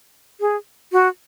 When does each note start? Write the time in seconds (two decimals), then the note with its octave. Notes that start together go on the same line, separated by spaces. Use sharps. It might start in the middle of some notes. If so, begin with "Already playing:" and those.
0.41 G#4
0.92 F#4